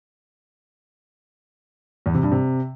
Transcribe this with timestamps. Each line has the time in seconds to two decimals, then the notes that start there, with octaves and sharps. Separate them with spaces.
2.06 E2
2.14 C3
2.23 G2
2.32 C3